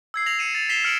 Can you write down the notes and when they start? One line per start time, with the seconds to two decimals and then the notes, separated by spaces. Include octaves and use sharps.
0.14 E6 G#6 C7
0.26 A#6 C7 F7 F#7
0.38 C7 C#7 D#7 E7 F#7
0.55 A6 F7
0.69 B6 C7 E7 F7 G7
0.84 F6 C#7 D7 F#7